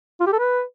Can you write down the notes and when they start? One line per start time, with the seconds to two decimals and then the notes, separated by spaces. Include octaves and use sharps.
0.20 F4
0.27 G4
0.33 A4
0.39 B4